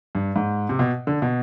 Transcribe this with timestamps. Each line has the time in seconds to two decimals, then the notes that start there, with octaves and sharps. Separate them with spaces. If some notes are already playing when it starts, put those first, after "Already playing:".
0.15 G2
0.36 G#2
0.69 C3
0.79 B2
1.07 D3
1.22 B2